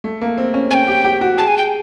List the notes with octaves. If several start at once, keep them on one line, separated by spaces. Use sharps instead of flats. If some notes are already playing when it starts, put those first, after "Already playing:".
A3
A#3
C4
C#4
C#4 G5 G#5
G4
G4
F#4
G#4 A5
G#5
G5